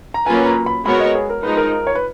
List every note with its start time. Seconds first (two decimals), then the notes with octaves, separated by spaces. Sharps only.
0.14 A#5
0.26 F#3 A#3 C#4 F4 B4 G#5
0.46 A#5
0.66 B5
0.85 G#3 B3 F#4 A#4 C#5 B5
1.00 D#5
1.15 G#4
1.29 A#4
1.43 F3 G#3 D#4 B4
1.57 A#4
1.87 C#5
1.95 B4